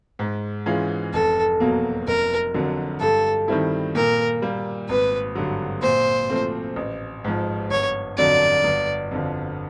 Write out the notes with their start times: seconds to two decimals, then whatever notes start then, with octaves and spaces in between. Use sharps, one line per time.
0.19 G#2
0.66 E3 G#3 C#4 F4
1.13 F1 A4
1.60 E2 B2 F#3 A#3
2.07 F1 A#4
2.54 F2 D3 F#3
3.00 G2 A4
3.48 D#3 G3 C4 E4
3.95 A#2 A#4
4.42 G3 A#3
4.89 G#1 B4
5.35 G2 D3 F#3
5.82 A#2 C5
6.30 F3 A3 C4
6.76 A1
7.24 G#2 F3
7.71 G1 C#5
8.18 F2 D3 F#3 D5
8.64 G1
9.11 F2 D3 F3